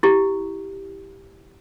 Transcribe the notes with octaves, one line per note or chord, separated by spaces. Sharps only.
E4 G4